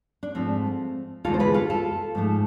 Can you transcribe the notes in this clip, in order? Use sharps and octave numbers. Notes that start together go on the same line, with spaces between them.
D4
G#2 F3 A3 C4
D2 C3 E3 G#3 B3 F4 A4
C5
G#4 B4
F4 A4
F4 A4
G#2 F3 A3